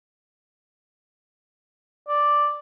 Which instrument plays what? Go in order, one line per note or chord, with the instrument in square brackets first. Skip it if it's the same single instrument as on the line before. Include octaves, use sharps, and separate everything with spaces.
[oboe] D5